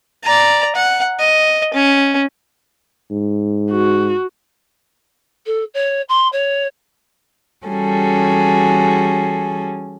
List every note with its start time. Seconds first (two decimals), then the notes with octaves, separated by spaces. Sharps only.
0.24 D5 A#5
0.76 F#5
1.19 D#5
1.74 C#4
3.11 G#2
3.71 F#4
5.46 A4
5.74 C#5
6.09 C6
6.33 C#5
7.66 E3 G3 C#4 F#4 G#4 A4